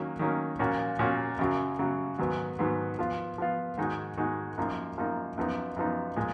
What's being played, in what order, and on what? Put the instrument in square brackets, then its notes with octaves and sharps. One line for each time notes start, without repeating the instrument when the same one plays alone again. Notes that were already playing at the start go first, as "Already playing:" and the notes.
Already playing: [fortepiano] D#3 F#3 A#3 C#4
D#3 F#3 A#3 C#4
A#2 F3 A#3 C#4 F#4
A#2 F3 A#3 C#4 F#4
F#2 C#3 F#3
F#2 C#3 F#3
G#2 D#3 F#3 B3
G#2 D#3 F#3 B3
F3 B3 F4
F3 B3 F4
G#2 D#3 G#3 D#4 F#4
G#2 D#3 G#3 D#4 F#4
F#2 F3 A#3 D#4
F#2 F3 A#3 D#4
F#2 F3 B3 D#4
F#2 F3 B3 D#4
A#2 F3 G#3